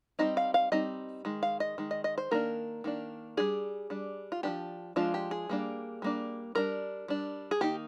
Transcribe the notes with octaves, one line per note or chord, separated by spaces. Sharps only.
G3 C4 D#4 D#5
F5
F5
G3 C4 D#4 D#5
D#3 G#3
F5
D#5
D#3 G#3
D#5
D#5
C5
D#3 A#3 D4 A#4
D#3 A#3 D4
G3 D4 G#4
G3 D4
F4
F3 G#3 D4 G4
F3 G#3 D4 F4
G4
G#4
G3 A#3 D4
G3 A#3 D4
G3 D4 A#4
G3 D4
G#4
D#3 A#3 D#4 G4